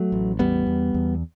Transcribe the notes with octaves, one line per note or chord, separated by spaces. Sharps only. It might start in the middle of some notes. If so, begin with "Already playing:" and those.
Already playing: F#3 A3
A1
E2 G3 B3
E2
E2